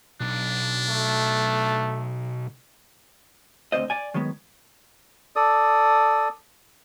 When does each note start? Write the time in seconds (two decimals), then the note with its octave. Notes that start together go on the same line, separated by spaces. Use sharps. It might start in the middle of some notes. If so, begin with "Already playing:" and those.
0.21 B1 D4
0.88 A3
3.72 D2 G#2 C4 C5 D#5
3.90 D5 G#5
4.14 D#3 F#3 G#3 B3
5.36 A4 D5 D#6